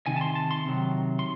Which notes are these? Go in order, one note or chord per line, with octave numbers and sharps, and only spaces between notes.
C3 D#3 G#5
A5
C6
A5
C6
C3 D#3 F#3
C6